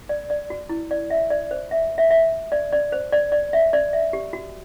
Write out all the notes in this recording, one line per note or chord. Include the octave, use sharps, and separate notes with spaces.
D5
D5
F#4
E4
D5
E5
D5
C5
E5
E5
E5
D5
D5
C5
D5
D5
E5
D5
E5
G4
F#4